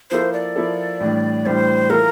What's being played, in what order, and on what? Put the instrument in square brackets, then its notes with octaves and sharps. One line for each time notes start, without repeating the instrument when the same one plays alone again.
[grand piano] F3 A#3 E4 A4 [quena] C5
[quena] D5
[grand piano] F3 A#3 E4 A4
A2 E3 G3 D4
[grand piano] A2 E3 G3 D4 [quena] C5
[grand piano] E3 A#3 F4 A4 [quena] A#4